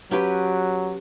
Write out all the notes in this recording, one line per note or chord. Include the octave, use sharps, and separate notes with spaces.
F#3 C#4 G4 B4